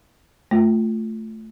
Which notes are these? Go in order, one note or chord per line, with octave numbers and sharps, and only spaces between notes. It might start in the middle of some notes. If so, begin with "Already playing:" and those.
A3 F4